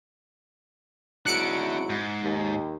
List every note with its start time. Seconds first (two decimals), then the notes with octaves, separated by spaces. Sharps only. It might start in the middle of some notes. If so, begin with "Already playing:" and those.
1.26 G#1 F#3 D4 E4 E5 F#6 C#7 D7
1.90 G#2
2.23 D#2